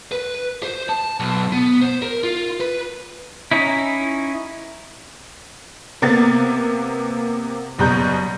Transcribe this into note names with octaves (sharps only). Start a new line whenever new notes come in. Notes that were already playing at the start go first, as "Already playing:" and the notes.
B4
C5
A5
B1
B3
C5
A#4
F4
B4
C#4 D#4 E4
C3 A#3 B3 A6
F#1 B2 G3 A#5 G6